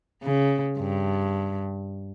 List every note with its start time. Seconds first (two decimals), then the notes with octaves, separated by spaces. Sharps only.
0.23 C#3
0.79 G2